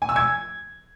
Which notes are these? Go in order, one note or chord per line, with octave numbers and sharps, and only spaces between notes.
G#5
E6
G#6